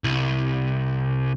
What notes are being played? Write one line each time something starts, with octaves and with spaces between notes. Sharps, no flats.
C2